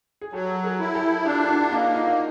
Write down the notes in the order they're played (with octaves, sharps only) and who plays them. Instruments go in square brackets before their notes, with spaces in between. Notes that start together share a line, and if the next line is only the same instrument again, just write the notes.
[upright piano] G#4
[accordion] F#3 [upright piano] G4 A4
[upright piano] G#4 A#4
[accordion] E4
[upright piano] G4 A4
[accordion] D4 [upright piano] F4 G4
[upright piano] E4 F#4
F#4
[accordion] A#3 [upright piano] D#4 F4
[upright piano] D#4 F4